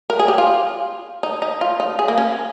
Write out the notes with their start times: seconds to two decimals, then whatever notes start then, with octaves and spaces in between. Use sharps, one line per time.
0.10 A#4
0.19 G#4
0.28 G4
0.38 F4
1.23 D#4
1.42 D#4
1.61 F4
1.80 D#4
1.99 G#4
2.08 A#3
2.18 C#4